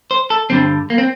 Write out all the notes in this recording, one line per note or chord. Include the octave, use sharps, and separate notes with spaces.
C5
A4
G2 D3 G3 C4
A#3
C4